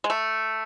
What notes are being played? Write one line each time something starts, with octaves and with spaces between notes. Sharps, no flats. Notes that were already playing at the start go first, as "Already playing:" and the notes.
G#3
A3